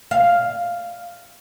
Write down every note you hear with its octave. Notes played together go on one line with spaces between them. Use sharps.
F5